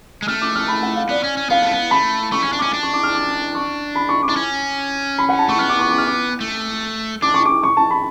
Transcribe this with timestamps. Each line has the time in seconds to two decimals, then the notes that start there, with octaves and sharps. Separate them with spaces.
0.22 G#3
0.28 A3 F6
0.42 D6
0.55 F6
0.68 B5
0.82 F#5
0.96 F5
1.09 B3 D5
1.24 C#4
1.37 C#4
1.50 B3 F5
1.62 A3
1.71 B3
1.91 A3 B5
2.32 A3 C#6
2.42 C#4
2.53 D4
2.59 C#4 D6
2.73 D4
2.83 C#6
2.93 D6
3.03 F6
3.14 D6
3.55 C#6
3.95 B5
4.09 C#6
4.23 D6
4.29 D4
4.36 C#4
5.18 B5
5.29 F#5
5.39 A5
5.49 A3 C#6
5.58 B3 F6
5.69 D6
5.79 C#6
5.90 D6
5.98 F6
6.07 D6
6.41 A3
7.22 D4 D6
7.34 C#6
7.45 D6
7.63 C#6
7.77 A5
7.91 B5